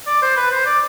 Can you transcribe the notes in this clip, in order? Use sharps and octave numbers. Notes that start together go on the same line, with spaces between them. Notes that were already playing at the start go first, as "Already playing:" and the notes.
D5
C5
B4
C5
D5